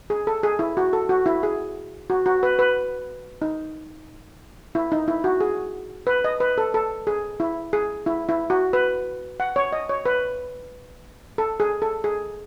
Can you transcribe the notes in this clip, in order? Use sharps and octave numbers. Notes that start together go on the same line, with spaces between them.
G#4
A4
G#4
E4
F#4
A4
F#4
E4
G#4
F#4
F#4
B4
B4
D#4
E4
D#4
E4
F#4
G#4
B4
D#5
B4
A4
A4
G#4
E4
G#4
E4
E4
F#4
B4
F#5
C#5
D#5
C#5
B4
A4
G#4
A4
G#4